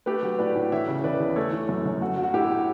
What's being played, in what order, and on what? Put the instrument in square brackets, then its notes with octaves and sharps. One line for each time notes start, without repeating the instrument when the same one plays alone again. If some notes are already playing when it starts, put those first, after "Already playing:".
[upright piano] A3 G4 B4
F#3
A2 B4 D5
A2
E3 C#5 E5
C#3
E2 B4 D5
E2
A3 A4 C#5
E3
F#2
F#2
A3 F#4
F#3
F#4
A2 E4 G4
A2